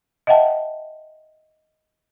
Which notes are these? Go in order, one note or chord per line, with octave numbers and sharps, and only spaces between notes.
D#5 E5 F#5 G5 A5